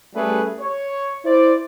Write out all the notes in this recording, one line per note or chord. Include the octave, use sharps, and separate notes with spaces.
G3 A3 C#4 G4 G#4 B4
C#5
E4 C5 D5